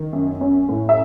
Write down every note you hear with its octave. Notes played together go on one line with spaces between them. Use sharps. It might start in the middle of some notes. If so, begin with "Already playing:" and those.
Already playing: D#3
F#2
C#4
A2
E5